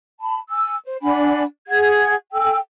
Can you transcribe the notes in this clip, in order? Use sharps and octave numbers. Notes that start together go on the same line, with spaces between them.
A5 B5
G#5 E6
C5
D4 F#5 G#5 B5
G#4 F#5 G#6
A4 G5 G#5 E6